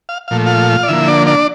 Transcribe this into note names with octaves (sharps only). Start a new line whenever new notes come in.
F5
A#2 F3 A3 F5
F4 F5
D5
D3 F3 A#3 E4 E5
D4 D5
D4 D5